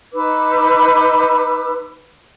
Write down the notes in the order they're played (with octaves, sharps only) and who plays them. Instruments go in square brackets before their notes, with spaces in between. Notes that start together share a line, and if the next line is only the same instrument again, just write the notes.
[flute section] D#4 B4 D6 E6